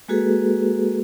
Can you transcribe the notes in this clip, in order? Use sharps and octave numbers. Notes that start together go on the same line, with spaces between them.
G#3 A#3 F#4 G#4 A4 B4